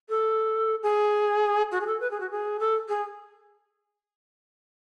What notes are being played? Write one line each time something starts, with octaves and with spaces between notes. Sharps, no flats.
A4
G#4
F#4
G#4
A4
B4
G#4
F#4
G#4
A4
G#4